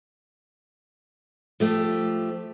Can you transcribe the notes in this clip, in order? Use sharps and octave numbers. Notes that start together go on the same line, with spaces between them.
F3 A3 G4